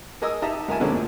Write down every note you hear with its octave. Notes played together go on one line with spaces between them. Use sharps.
G#4 A#4 D#5 G#5 D#6 E6
D#4 G4 D#5 E5 A5 A#5
C#2 A#4 E5 G#5 A5
B2 D3 G#3 A#3 C4 C#4
D2 A#2